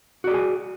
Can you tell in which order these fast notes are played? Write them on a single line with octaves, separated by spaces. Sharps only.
F#4 D5 G#4 G#5